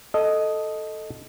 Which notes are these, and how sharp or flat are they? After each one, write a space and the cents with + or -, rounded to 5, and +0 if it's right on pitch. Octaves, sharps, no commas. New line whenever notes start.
A4 +0 D#5 +0